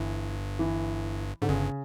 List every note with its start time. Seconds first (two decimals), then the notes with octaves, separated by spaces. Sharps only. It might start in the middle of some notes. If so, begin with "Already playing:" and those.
Already playing: G1 G2 E3
0.59 E3
1.42 G#2 D3
1.49 G1 G2 C#3